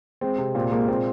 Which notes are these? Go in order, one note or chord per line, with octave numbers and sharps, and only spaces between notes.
G#3 C4
C3
A#2 C4
G#3 A#3
A#2 C4